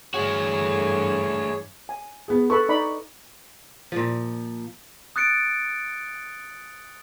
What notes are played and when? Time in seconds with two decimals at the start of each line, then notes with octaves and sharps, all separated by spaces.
0.14 G2 E3 A3 F#4 G#4 C#5
1.89 G#5
2.28 B3 G#4
2.50 A4 B4 B5 C#6
2.69 D#4 D5 B5
3.92 A#2 F3
5.16 D#6 F#6 A6 C#7 D7